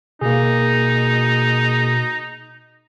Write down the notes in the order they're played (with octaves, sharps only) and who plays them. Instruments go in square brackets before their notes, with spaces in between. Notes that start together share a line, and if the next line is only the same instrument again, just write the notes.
[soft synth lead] B2 [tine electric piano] A#3 G#4 [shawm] D#4